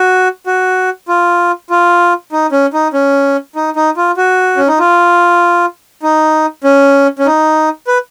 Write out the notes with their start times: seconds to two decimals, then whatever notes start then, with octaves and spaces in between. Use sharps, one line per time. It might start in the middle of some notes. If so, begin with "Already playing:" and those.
Already playing: F#4
0.47 F#4
1.08 F4
1.70 F4
2.32 D#4
2.52 C#4
2.73 D#4
2.94 C#4
3.55 D#4
3.76 D#4
3.97 F4
4.17 F#4
4.57 C#4
4.68 D#4
4.79 F4
6.03 D#4
6.64 C#4
7.19 C#4
7.26 D#4
7.87 B4